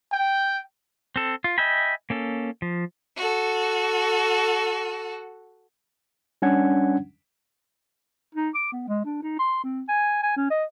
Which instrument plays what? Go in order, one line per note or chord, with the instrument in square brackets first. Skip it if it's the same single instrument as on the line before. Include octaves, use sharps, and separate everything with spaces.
[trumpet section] G5
[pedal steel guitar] C4 A4
F4
D#5 E5 G5 G#5 B5
A#3 C#4 A4
F3
[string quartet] F#4 A4
[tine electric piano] G3 C#4 D4 F#5 G#6
[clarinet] D#4
D6
B3
G#3
D4
D#4
C6
C4
G#5
G#5
C#4
D#5